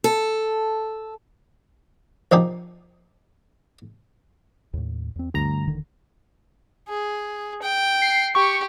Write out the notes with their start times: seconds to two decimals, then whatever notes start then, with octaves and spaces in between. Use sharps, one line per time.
0.04 A4
2.32 A#1 F3 D#4 G4
4.73 D#2 A2
5.16 E2 C4
5.34 D2 G2 A#5
5.67 D#1 D3 D#3
6.89 G#4
7.62 G5
8.02 C7
8.35 G4 C#6